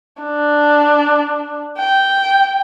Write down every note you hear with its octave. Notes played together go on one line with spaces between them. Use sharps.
D4
G5